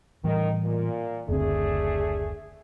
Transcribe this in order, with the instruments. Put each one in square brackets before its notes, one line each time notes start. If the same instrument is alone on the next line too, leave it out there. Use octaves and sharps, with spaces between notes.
[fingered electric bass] A2 E3 G3 [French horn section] D#3
[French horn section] A#2
[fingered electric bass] F#1 D2 C4 [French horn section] A3 D4 G#4